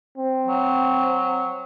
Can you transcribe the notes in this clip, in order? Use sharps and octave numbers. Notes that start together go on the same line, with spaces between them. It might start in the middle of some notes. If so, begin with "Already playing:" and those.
C4
F#3